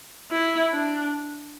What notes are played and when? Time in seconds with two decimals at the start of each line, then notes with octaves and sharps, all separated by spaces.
0.31 E4
0.72 D4